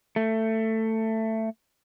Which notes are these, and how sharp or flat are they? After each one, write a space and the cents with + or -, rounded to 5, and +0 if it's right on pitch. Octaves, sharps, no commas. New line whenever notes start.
A3 +15